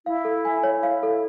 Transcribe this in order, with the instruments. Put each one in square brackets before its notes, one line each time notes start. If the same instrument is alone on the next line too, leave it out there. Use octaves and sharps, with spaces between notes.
[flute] E4 [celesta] F5
[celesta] A4
G#5
[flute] E4 [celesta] C#5
[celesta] F5
A4